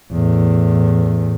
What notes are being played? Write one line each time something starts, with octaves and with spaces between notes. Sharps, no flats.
E2 A2